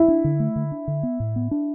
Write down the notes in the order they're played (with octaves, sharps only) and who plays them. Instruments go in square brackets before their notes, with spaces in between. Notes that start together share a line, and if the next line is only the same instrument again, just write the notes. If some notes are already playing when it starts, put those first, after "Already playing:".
Already playing: [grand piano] E4
[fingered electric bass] D4
D3
A3
D3
D4
D3
B3
A2
B3
D4